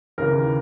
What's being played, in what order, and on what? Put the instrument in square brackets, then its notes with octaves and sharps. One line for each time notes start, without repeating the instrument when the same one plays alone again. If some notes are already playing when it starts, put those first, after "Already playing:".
[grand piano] D#2 C#3 E3 A#4